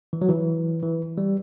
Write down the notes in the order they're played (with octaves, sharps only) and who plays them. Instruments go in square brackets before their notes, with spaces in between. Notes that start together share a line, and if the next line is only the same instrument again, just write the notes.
[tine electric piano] E3
F#3
E3
E3
G3